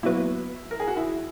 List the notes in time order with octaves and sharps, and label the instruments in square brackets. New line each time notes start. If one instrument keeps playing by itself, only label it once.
[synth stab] A#2 F#3 B3 [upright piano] E4
[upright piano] A#4
G#4
F#4
E4